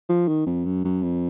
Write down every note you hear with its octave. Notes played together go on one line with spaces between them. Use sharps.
F3
D#3
F2
F#2
F#2
F2